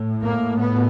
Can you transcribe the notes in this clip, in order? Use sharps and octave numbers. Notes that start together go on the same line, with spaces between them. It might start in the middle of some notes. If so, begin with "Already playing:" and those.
Already playing: A2
A#3
B3